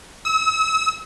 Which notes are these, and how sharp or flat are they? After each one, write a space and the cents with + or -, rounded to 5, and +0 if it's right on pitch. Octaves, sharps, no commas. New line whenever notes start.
E6 -40